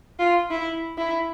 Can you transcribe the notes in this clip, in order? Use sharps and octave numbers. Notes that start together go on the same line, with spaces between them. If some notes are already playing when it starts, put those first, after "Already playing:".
F4
E4
E4